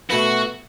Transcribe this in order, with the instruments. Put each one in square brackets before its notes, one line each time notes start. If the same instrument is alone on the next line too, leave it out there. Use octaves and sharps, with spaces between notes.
[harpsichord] B2 A3 E4 B4 [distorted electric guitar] F#4